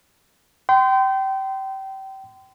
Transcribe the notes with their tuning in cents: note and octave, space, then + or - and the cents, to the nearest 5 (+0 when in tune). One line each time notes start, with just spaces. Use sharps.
G5 -25 C6 -30